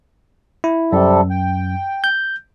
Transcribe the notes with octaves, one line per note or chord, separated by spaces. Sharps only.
E4
F#2 C3 G3 A4
G5
G6